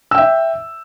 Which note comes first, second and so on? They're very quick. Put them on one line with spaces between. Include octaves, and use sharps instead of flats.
E6 G5 E5